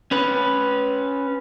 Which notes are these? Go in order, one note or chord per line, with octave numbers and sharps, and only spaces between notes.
C#4 B4